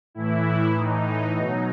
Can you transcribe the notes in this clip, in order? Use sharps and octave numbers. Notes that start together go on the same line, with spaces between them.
A2 E3 E4
A2 E3 D#4
B2 F#3